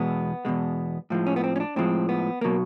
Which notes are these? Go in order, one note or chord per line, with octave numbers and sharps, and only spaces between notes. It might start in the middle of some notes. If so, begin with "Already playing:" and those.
Already playing: E2 B2 G#3 B3
E2 B2 G#3
A2 F3 G#3
C#4
B3
C4
C#4
D4
A2 F3 G#3 C4
B3
B2 F#3 A#3